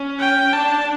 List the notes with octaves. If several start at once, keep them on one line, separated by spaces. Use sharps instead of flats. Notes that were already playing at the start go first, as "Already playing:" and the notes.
Already playing: C#4
G5
D4 A5